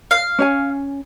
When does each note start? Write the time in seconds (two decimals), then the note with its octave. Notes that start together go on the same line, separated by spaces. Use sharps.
0.11 F5
0.39 C#4 C#5 G#5